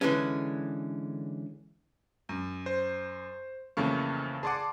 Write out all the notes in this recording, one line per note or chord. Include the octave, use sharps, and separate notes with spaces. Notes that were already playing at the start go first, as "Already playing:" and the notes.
D3 E3 G#3 C#4
F#2
C5
F2 C#3 E3 A3 A#3 C#6
G#4 D5 F#5 A5 C6 D6